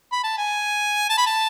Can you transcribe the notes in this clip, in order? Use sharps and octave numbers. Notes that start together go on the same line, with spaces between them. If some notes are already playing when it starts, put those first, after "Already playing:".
B5
A5
G#5
A5
B5
A5